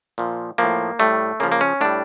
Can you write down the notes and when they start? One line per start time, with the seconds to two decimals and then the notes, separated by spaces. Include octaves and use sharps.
0.18 A#2 F3
0.58 A2 F3 A#3
0.99 A2 G3 A3
1.40 C#3 A#3
1.43 F3
1.52 A#3
1.61 C#4
1.81 A2 G3 D4